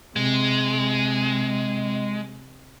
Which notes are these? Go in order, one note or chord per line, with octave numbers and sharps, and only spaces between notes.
C3 G#3